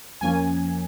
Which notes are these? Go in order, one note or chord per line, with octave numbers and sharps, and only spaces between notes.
F2 F3 A#3 C#4 G#5